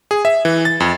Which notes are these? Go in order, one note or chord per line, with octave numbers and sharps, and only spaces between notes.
G#4
E5
E3
A6
F2